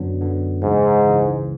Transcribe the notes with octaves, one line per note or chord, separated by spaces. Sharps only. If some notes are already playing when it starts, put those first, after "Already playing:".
Already playing: F#2 D3 F#3 B3 D4
F#2 D3 F#3 B3 D4
C#2 G#2 C#3 E3
C#2 C#3 E3